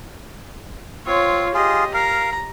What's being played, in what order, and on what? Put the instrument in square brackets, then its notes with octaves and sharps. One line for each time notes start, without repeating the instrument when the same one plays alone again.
[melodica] C4 [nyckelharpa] F4 C#5
[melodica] F4 G#4 [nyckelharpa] G4 D#5
[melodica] A#4 F5 [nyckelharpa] A#5